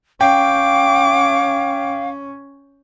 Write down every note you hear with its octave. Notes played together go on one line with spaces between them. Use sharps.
C#4 F5 G5 D6